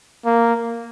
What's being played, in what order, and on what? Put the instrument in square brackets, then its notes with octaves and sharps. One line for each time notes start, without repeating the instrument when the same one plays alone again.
[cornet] A#3